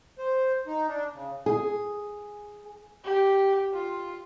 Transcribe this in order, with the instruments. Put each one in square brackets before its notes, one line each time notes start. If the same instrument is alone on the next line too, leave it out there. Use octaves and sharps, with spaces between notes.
[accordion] C5
D#4
D4
C#3
[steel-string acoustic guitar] G#4
[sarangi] G4
F4